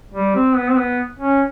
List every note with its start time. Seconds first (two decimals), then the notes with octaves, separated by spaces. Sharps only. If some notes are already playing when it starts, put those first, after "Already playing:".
0.14 G3
0.35 C4
0.56 B3
0.69 C4
0.77 B3
1.19 C#4